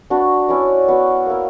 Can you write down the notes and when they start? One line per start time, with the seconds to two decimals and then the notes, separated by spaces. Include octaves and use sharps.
0.10 D4 F#4 B4
0.49 C#4 E4 B4 D5
0.88 B3 F#4 B4
1.26 A#3 E4 A#4